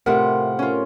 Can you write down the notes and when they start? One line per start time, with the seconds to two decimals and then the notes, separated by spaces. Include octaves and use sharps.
0.06 A2 C3 F4 A#4 F#5
0.59 C#4 F4